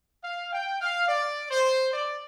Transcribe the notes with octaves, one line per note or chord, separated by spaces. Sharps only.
F5
G5
F5
D5
C5
D5